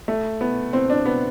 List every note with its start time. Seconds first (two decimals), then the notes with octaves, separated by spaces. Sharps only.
0.08 A3
0.41 B3
0.73 C4
0.90 D4
1.06 B3